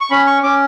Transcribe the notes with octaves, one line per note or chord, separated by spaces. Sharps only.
C#6
C#4 B5
C#6
C#4 D6